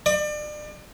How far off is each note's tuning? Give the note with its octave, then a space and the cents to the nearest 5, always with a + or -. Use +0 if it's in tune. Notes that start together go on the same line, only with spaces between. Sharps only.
D5 +35